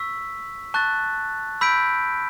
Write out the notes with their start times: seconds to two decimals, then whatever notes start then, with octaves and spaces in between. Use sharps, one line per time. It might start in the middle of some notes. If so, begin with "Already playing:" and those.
Already playing: C#6 E6 B6
0.74 A5 C#6 F#6 A6
1.61 B5 E6 G6 B6 D7